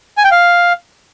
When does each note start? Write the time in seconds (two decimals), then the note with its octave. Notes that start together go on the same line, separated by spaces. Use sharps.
0.17 G#5
0.24 G5
0.31 F5